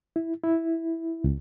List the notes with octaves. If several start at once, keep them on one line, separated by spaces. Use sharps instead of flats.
E4
E4
C#2